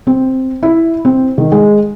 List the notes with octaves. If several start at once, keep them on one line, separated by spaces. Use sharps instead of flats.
C4
E4
C4
D#3
G#3